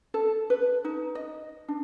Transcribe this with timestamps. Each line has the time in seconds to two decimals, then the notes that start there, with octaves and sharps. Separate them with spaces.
0.14 A4
0.50 B4
0.85 D#4
1.15 D#5
1.68 D4